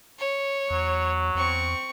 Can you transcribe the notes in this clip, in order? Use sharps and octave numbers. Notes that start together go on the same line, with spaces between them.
C#5
E2 F#3
E2 C4 C#6